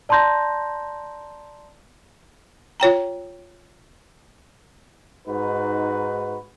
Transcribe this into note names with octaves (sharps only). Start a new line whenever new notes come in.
D5 A5 A#5 C6 G6 A#6
F4 C#5 G5 A#5
G#2 D#4 F#4 B4